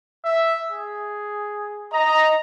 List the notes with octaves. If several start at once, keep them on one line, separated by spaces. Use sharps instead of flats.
E5
G#4
D#5 A#5